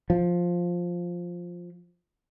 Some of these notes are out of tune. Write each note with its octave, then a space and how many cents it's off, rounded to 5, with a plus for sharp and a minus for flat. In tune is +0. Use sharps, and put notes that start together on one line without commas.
F3 +5